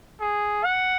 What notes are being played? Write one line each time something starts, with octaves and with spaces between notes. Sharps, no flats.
G#4
F#5